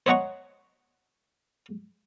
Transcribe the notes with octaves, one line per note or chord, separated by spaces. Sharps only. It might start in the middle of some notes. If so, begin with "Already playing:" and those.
C5 C#5 D#5 F#5 A#5 C#6